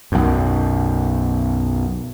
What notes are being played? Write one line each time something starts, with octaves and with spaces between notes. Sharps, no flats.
B1 F#2